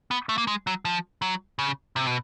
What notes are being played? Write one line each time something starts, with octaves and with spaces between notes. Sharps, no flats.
B3
A3
A#3
G#3
F#3
F3
F#3
C#3
C3
B2